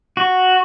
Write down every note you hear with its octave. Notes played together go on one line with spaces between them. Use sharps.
F#4